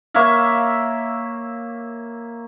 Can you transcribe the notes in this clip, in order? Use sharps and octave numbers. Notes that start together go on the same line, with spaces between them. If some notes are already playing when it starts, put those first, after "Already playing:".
A#3 C#5 E5 F5